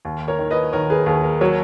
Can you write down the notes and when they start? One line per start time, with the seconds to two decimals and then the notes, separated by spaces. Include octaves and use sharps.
0.05 D#2
0.28 A#4 C#5
0.39 D#3
0.51 B4 D#5
0.73 D#3 A#4 C#5
0.90 G#4 B4
1.06 D#2 G#4
1.24 A#4
1.41 F#3 A#4 C#5